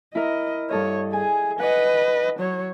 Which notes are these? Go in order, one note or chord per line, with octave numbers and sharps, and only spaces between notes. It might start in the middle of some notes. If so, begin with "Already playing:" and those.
E4 A#4 D#5
G2 A4 C#5 D#5
G#4 G#5
B4 D#5 F#5
F#3 C#5